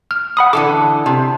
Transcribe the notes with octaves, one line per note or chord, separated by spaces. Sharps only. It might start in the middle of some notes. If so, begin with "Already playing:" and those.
F6
F#5 B5 D#6
D3 E3 A4 D6
C3